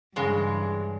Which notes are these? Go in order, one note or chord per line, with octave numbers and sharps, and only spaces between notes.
G2 C#3 E3 G#3